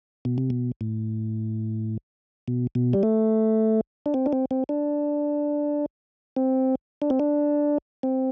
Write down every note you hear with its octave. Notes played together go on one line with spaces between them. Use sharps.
B2
C3
B2
A2
B2
B2
G3
A3
D4
C4
D4
C4
C4
D4
C4
D4
C4
D4
C4